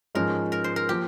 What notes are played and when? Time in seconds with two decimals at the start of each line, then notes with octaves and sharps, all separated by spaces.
0.15 G#2 F3 G#3 C#4 A#4
0.52 A#4
0.64 C5
0.76 A#4
0.89 F3 A#3 G4